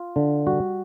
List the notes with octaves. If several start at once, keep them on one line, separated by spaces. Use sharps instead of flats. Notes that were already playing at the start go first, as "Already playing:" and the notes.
Already playing: F4
D3
G3 F#4